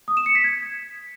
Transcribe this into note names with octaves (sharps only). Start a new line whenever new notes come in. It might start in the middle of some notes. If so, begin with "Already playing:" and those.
D#6
E7
C#7
B6
G#6